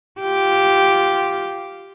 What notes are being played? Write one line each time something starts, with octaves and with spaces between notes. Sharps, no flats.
F4 G4